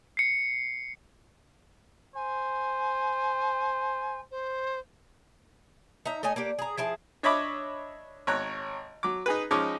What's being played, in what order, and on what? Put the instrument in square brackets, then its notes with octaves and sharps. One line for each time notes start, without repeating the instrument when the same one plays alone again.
[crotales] C7 C#7
[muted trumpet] C5 [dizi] G#5
[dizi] C5
[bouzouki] D#4 E5 A#5
A3 D#4 D#5 G#5
A#3 D4 G4
G#4 A#5
F3 E4 G#4 A5
[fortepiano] D4 C#5 D#5 E5 B5 D6
G#1 C#5 A#5 F#6
F#3 D6
D#4 G#4 B4
F3 G#3 C#4 D#4 C#6 D6